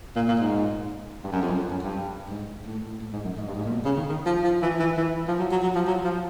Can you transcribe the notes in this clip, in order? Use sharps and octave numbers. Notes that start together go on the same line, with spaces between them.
A#2
A#2
G#2
G2
F#2
F2
F#2
F2
F#2
G2
G#2
A2
A2
G#2
F#2
G#2
G2
G#2
A#2
B2
C#3
D#3
D#3
F3
F3
E3
E3
E3
F3
F#3
F#3
F#3
F3
F#3
F3